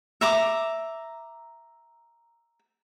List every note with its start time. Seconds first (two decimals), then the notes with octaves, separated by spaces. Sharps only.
0.21 E5 A#5 D6